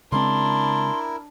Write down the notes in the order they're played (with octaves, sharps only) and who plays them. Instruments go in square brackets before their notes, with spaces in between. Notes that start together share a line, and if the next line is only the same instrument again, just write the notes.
[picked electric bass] C#3 G#3 C4 [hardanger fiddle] D4 [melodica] E4 A#4 [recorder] C6